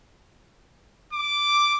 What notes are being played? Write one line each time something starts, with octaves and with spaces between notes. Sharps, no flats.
D6